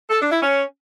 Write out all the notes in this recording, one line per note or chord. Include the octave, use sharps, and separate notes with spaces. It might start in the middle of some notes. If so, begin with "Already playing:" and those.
A4
D4
E4
C#4